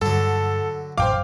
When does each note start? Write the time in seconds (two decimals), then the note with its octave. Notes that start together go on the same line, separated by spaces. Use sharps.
0.02 G2 D3 F#3 A4
0.98 A1 F#2 C5 F5 G5 D6